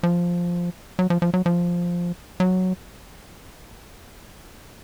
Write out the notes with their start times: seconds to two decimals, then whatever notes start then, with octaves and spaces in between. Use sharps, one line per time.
0.03 F3
0.99 F#3
1.10 F3
1.22 F3
1.34 F#3
1.46 F3
2.40 F#3